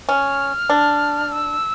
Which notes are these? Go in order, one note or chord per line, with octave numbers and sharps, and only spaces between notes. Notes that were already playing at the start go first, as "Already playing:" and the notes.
C#4 F6
D4
E6